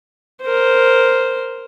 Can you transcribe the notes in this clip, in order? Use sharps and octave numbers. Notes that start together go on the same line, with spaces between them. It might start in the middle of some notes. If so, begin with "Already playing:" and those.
A#4 C5